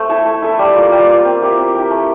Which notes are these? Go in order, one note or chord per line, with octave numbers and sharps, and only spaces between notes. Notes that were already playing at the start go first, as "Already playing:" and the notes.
Already playing: A3 C4 C5
E4 A4 E5
A3
E4 A4 E5
G3
A#3 F4
G3
A#3 F4
C4
E4 G4 A#4
C4
E4 G4 A#4
A3